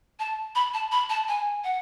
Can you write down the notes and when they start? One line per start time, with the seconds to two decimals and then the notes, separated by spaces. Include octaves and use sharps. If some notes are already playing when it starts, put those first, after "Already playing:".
0.19 A5
0.55 B5
0.74 A5
0.92 B5
1.10 A5
1.28 G#5
1.64 F#5